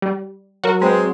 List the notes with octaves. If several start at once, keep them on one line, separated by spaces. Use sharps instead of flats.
G3
F#3 F#4 A#4
G#3 C4 B4